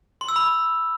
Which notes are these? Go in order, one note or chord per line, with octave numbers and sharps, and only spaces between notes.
C6
E6
B5